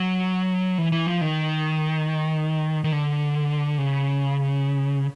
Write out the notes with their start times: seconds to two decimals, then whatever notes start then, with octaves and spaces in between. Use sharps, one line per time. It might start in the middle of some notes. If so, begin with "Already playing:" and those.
Already playing: F#3
0.78 E3
0.92 E3
1.07 F3
1.21 D#3
2.84 D#3
2.92 D3
3.78 C#3